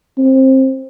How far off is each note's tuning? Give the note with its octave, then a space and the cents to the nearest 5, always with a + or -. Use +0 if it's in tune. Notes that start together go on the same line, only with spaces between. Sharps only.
C4 +20